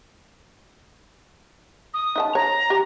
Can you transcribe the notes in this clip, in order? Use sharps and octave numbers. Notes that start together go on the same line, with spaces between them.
D#6
D#4 E5 A5
C#5 A#5
G4